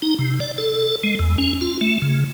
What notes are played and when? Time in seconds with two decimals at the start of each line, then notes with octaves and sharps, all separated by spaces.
0.02 D#4
0.19 C3
0.40 D5
0.58 A4
1.03 G#3
1.19 E2
1.38 C#4
1.61 F4
1.81 A3
2.02 C#3